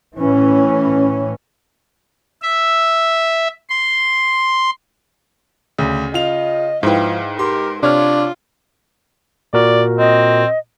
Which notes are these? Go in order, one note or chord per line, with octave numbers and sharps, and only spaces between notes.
A2 E3 C#4
E5
C6
D2 C#3
F4 D#5 F7
G#2 F3 E4 B4 F5 G5
G4 A#4 C6
C3 D4 F4 C#5 F6
A#2 F#4 A#4 D5
C4 D#5